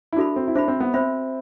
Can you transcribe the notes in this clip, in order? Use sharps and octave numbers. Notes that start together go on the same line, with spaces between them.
E4
D4 F#4 A4 E5 B5
C4
E4
D4 C5 E5 B5
C4
B3
C4 C5 E5 B5